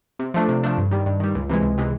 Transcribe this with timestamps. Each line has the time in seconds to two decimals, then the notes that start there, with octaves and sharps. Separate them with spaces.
0.19 C3
0.34 F3 A3 D4
0.48 C3
0.63 F3 A3 D4
0.78 G2
0.91 D#3 G3
1.06 G2
1.20 D#3 G3
1.35 C#2
1.49 C3 E3 G#3
1.63 C#2
1.78 C3 E3 G#3